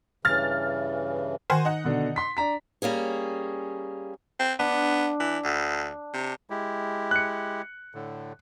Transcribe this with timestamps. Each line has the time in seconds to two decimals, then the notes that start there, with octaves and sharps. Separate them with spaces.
0.25 G2 C#3 E3 F6 A6
1.50 D#3 F#4 C5 G#5
1.65 D#4 F#5
1.84 B2 D3
2.16 C6 B6
2.37 D4 A#5 B6
2.82 G3 A#3 C#4 G#4
4.40 C4
4.59 B3 D4
5.20 E3
5.44 D2
6.14 C3
6.50 G#3 E4 G4
7.11 F#6 C#7
7.95 A2 D3